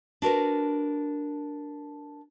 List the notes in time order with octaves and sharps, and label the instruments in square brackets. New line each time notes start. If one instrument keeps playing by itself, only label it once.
[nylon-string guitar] D4 F#4 A#4 B4